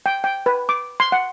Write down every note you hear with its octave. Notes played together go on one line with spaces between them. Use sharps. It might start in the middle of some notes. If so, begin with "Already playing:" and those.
G5
G5
B4
D6
C6
F#5